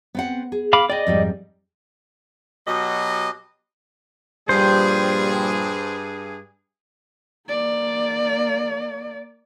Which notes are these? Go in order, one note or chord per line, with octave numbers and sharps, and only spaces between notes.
B3 C4 F#5
G#4
F5 B5 D6
D5 D#5 G5 G#5
F2 G#2 G3
B2 F#3 G4 D#5
G2 A#2 F3 G3 G#4 C5
A#3 D5